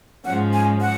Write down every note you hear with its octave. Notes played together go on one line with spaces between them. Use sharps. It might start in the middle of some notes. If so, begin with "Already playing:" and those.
G#2 F3 G#3 C#4 F#5
G#5
F#5